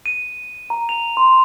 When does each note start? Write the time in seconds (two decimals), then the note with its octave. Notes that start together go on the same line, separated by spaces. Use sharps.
0.06 D#7
0.70 A#5
0.89 F7
1.17 C6